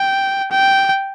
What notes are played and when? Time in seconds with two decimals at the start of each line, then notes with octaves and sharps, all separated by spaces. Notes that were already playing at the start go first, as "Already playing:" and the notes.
Already playing: G5
0.51 G5